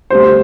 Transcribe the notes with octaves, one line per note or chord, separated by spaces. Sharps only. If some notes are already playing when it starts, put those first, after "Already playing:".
D2 C3 G3 C5